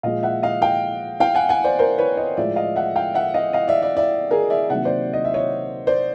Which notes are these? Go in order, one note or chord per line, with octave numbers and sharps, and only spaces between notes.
A#2 F3 G#3 D#5 F5
E5 F#5
D#5 F5
F5 G5
F5 G5
F#5 G#5
F#5 G#5
C5 D5
A#4 C5
B4 C#5
C#5 D#5
A2 F3 G#3 D5 E5
D#5 F5
E5 F#5
F5 G5
E5 F#5
D#5 F5
D#5 F5
D5 E5
D5 E5
D5 E5
G#4 A#4
D5 E5
C3 D#3 F#3 A#3 E5 F#5
C5 D5
D#5
E5
C#5 D#5
C5 D5